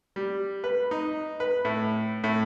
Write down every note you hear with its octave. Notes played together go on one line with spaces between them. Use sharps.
G3
B4
D#4
B4
A2
A2